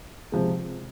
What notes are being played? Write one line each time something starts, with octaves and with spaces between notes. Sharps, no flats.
C3 F3 G#3